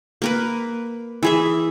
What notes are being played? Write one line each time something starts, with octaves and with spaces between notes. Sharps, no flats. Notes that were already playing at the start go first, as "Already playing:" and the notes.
A#3 A#4 B4
E3 G#4 E5